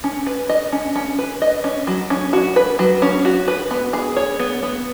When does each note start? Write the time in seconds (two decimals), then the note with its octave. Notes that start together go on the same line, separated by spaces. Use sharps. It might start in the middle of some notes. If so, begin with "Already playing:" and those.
0.04 C#4
0.27 B4
0.49 D#5
0.72 C#4
0.96 C#4
1.19 B4
1.42 D#5
1.64 C#4
1.87 F#3
2.10 C#4
2.33 F#4
2.56 B4
2.79 F#3
3.02 C#4
3.25 F#4
3.48 B4
3.71 B3
3.93 G#4
4.17 C#5
4.40 B3
4.63 B3